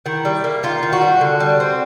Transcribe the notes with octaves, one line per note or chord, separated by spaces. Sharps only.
D#3 E4
G3
A#3
D#3 F4
D#3
F#4
G3
D3
G3
C4